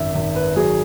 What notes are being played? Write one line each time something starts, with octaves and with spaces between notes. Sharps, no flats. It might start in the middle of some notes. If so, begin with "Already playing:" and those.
Already playing: G#1 F#2 E5
G#1
B4
F#3 G#4